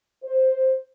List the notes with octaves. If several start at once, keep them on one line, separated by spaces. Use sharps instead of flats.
C5